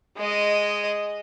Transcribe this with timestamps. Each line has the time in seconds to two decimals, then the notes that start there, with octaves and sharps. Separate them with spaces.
0.17 G#3 D#5